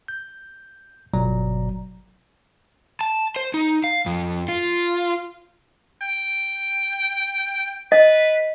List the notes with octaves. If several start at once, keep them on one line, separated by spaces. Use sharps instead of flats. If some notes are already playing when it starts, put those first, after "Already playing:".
G6
G1 B2 F#3 D5 A#5
A5
C5
D#4
F5
F2
F4
G5
B4 D#5